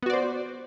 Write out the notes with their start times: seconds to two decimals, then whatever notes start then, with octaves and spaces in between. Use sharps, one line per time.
0.03 B3
0.06 F#4
0.10 D5
0.13 C5